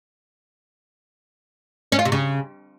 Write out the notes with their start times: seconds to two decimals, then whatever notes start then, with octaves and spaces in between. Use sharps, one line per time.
1.92 C#4
1.99 F4
2.05 C3
2.12 C#3